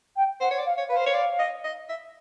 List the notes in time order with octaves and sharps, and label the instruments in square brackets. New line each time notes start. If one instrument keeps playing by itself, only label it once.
[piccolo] G5
[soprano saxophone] C5 [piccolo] F#5
[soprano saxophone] C#5
D5
[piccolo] F5
[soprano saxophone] C#5
[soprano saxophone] B4 [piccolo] F5
[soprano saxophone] C5
C#5
D5
D#5
D#5
E5